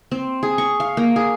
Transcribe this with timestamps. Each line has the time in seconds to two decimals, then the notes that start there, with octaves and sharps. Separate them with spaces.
0.11 C4
0.43 G#4
0.58 C#6
0.80 F5
0.97 A#3
1.16 G#4